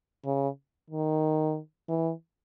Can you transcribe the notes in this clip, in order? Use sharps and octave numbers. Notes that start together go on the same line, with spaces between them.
C#3
D#3
E3